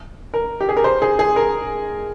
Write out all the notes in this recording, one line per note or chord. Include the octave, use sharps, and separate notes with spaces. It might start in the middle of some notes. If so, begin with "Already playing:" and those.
A#4
G4
G#4
A#4
C5
G#4
G#4
A#4